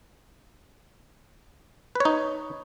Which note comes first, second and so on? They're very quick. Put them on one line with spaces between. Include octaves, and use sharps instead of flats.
B4 C#5 D#4